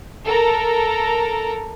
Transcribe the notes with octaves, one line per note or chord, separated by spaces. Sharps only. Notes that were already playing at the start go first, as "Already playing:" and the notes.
A4 A#4 A#5